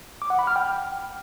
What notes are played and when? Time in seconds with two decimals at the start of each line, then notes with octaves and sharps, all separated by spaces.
0.22 D6
0.30 F#5
0.39 B5
0.47 F6
0.56 G5